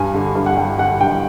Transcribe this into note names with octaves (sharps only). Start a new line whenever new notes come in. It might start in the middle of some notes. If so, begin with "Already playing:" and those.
Already playing: G2 G#5
D3
G2
F#5
G2 G5
D3 F#5
G2 G5